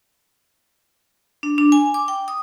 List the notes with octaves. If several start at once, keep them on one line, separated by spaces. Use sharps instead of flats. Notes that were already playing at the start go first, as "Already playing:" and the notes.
D4
D4
G#5
D6
G5
D#6